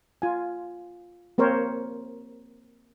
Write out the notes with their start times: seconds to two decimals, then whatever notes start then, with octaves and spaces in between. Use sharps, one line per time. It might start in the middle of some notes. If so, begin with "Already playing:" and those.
0.22 F4 G#5
1.38 A#3 C4 A#4 C5 C#5